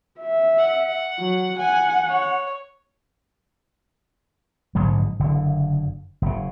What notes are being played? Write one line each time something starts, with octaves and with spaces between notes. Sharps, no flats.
E5
F#5
F#3
F#5 G#5
C#5
A#1 G#2 D3 F#3
F#1 D3
F#1 C#3